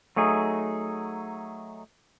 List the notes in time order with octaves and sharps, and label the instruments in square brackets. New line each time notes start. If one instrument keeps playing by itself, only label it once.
[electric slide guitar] F#3 A3 D#4 G#4